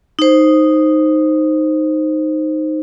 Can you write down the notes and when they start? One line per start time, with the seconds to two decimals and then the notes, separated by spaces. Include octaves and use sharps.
0.19 D#4 C5